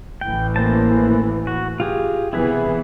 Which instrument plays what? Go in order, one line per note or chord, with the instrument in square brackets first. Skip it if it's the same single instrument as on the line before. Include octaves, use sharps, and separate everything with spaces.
[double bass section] A1 A2 E3 [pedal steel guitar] G5
[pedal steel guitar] A#3 C5 A5
F#4
F4 G4 G#4
[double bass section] C3 E3 B3 [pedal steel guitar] E4 G#4 B4